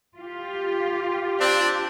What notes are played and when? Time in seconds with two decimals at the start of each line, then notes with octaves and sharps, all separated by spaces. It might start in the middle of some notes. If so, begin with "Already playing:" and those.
0.19 F4 G4
1.39 C4 D4